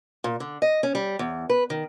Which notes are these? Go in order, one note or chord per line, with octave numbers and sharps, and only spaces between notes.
A#2
D3
D#5
C#4
G3
E2
B4
D#3